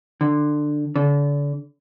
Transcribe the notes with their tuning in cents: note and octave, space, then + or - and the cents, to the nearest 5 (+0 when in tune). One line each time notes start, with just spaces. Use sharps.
D3 +15
D3 -35